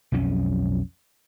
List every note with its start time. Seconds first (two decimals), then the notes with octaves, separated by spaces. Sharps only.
0.12 B1 F2 F#3 C#4